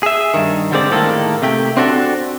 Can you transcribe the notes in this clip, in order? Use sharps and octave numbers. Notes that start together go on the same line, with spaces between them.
G#4 E5
G2 D#3
D3 G3 G#3 C4 D5
A2 D#3 G#3 A#3 A4
C3 A3 G4
C4 D4 F#4 A4